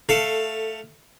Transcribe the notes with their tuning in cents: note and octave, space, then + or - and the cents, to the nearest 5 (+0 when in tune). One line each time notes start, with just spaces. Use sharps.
A3 +0 A4 +15 F5 +0